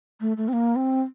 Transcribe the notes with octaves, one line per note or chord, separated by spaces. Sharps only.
A3
A3
C4
A#3
C4